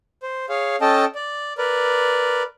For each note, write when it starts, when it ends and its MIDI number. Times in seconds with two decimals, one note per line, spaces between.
0.23 0.46 72
0.49 0.76 68
0.49 0.76 73
0.49 0.76 77
0.81 1.05 61
0.81 1.05 69
0.81 1.05 75
0.81 1.05 79
0.81 1.05 81
1.15 1.53 74
1.58 2.43 70
1.58 2.43 71
1.58 2.43 74